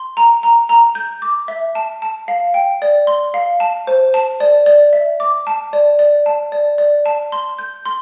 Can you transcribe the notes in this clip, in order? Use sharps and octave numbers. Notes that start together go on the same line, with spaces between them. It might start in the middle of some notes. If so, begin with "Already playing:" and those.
Already playing: C6
A#5
A#5
A#5
G6
D6
E5
A5
A5
F5
G5
D5
C6
F5
A5
C5
A5
D5
D5
E5
D6
A5
D5
D5
A5
D5
D5
A5
C6
G6
C6